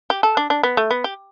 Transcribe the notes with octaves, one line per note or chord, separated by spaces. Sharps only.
G4
A4
D4
D4
B3
A3
B3
G4